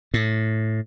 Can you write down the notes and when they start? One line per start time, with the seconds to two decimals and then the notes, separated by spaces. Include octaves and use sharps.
0.14 A2